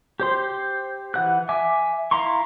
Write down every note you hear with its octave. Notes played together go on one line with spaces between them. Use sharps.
G4 C5 C6
E3 F#5 F#6
E5 G#5 D6
E4 F5 A#5 C6 C#6